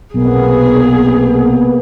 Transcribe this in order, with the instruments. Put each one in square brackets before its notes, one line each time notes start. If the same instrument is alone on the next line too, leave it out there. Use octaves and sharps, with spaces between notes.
[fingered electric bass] B1 [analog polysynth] C3 A#3 B3 [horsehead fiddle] G#4